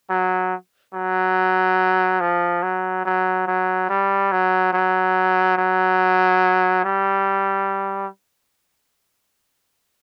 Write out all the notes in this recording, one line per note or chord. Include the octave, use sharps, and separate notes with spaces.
F#3
F#3
F3
F#3
F#3
F#3
G3
F#3
F#3
F#3
G3